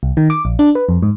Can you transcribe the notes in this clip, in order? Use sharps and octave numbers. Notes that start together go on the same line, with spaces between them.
C2
D#3
D6
A#1
D4
B4
F2
G#2